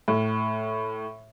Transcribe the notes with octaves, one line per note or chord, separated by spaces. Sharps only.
A2